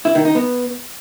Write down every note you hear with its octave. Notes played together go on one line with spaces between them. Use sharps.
E4
D#3
D#4
B3